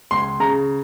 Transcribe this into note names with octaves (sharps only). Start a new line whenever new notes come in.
C#2 C6
C#3 A#5